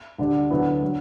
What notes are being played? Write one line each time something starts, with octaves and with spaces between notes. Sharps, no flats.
D2 D3 G3 D4
D2 D3 F#3 B3 E4
D3 F#3